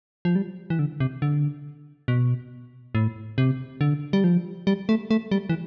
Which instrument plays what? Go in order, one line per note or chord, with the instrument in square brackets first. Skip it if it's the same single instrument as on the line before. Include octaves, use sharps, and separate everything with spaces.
[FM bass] F3
G3
E3
D3
C3
D3
B2
A2
C3
D3
G3
F3
G3
A3
A3
G3
E3